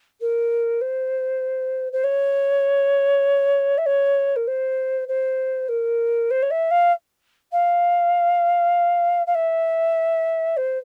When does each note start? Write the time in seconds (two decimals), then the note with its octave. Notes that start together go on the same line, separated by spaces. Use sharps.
0.20 A#4
0.81 C5
1.92 C5
2.03 C#5
3.77 E5
3.86 C#5
4.36 A#4
4.47 C5
5.08 C5
5.68 A#4
6.30 C5
6.42 C#5
6.50 E5
6.70 F5
7.52 F5
9.26 F5
9.34 E5
10.57 C5